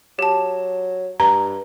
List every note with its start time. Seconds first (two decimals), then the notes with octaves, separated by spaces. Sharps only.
0.19 F#3 G4 A5
1.20 G2 A#5